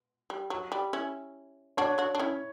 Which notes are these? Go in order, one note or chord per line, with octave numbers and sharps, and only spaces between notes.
G3
F#3
G3
C#4 E4
D4 F#4 C#5
D4 F#4
D4
C#4 E4